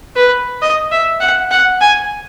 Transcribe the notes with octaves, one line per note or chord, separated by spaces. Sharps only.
B4
D#5
E5
F#5
F#5
G#5